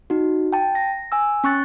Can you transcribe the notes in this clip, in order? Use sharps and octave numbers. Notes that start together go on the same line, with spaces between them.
D#4 F#4
G5 A5
A#6
G#5 E6
C#4 C#6 F#6 A6